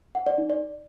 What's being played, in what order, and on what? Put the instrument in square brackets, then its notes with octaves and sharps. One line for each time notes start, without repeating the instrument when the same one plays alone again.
[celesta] F#5
D5
D#4
D5